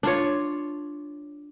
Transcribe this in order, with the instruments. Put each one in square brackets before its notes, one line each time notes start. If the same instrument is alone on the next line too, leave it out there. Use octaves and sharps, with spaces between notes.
[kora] D4 F4 C#5